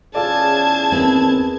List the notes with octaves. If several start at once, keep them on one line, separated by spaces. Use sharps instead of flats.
E2 C#4 F4 G#4 A4 D5 A5 G#6
D#2 B3 C4